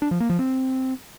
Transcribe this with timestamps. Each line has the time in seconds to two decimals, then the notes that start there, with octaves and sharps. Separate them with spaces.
0.02 D4
0.11 F3
0.20 A#3
0.30 F3
0.39 C4